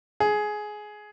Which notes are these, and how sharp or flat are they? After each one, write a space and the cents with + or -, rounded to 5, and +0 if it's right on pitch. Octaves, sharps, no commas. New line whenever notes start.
G#4 +15